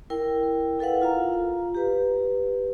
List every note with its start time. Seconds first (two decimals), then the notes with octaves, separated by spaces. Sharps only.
0.10 E4 A#4 G5
0.79 E4 A4 B4 F5 F#5
1.02 F4 F5 A#5
1.75 G4 B4